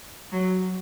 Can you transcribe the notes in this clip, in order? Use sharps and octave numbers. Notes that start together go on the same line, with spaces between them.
F#3